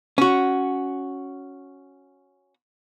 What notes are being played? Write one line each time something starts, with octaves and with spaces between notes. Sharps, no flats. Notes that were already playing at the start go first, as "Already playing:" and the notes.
C#4 F#4